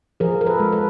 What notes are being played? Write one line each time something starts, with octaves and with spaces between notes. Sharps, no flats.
F3 G#4 A#4
A#4
A4 B4
G#3
A4 B4